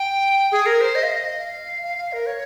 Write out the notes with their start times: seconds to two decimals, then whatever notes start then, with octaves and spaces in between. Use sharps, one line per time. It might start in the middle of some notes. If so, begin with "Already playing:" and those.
Already playing: G5
0.52 G#4
0.66 A#4
0.81 C5
0.95 D#5
1.03 F5
1.12 D#5
1.39 F5
1.83 F5
1.98 F5
2.13 A#4
2.26 C#5